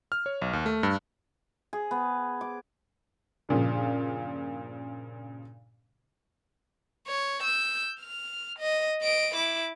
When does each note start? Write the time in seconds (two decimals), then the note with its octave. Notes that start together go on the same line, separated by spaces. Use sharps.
0.12 F6
0.26 C#5
0.42 B1
0.53 D#2
0.66 A3
0.83 G2
1.73 G#4
1.91 B3
2.41 D6
3.49 G2 A#2 C#3 F3
7.08 C#5
7.42 E6 G6
8.00 F6
8.59 D#5
9.02 D#5 D7
9.35 E4 D6